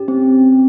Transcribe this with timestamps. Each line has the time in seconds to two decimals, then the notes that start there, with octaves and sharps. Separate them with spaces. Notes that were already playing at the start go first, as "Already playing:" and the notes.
Already playing: C#4 G4
0.08 C4